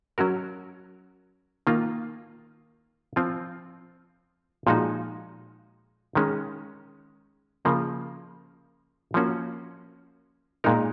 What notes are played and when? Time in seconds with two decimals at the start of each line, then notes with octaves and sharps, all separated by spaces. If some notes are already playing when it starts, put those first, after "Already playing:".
0.18 F#3 C#4 F#4 A#4
1.67 D#3 A#3 F4
3.16 F3 C4 F4
4.67 A#2 F3 G#3 D#4 F#4
6.15 D#3 G#3 C#4
7.65 C#3 F3 A#3
9.14 F3 A#3 C#4 F#4
10.64 A#2 G#3 D#4 A#4